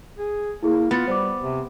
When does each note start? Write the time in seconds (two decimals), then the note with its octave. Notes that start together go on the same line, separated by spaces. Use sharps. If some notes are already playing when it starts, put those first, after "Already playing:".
0.18 G#4
0.63 A#3 E4 G#4
0.91 B3 F4 B5 A6 C#7
1.07 G3 C5 D6
1.40 C3